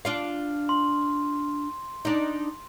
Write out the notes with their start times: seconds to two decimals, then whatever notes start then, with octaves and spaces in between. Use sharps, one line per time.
0.05 D4 F4 F5
0.69 C6
2.05 D4 D#4